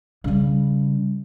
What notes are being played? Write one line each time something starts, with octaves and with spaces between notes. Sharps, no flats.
C#3 G3